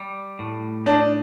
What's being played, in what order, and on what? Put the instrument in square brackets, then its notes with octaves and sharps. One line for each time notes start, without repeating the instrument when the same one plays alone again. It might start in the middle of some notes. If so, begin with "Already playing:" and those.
Already playing: [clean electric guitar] G3
A2
[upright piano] D4 [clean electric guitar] D#4